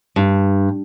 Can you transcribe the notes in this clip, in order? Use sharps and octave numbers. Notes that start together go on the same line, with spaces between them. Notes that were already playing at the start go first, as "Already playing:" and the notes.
G2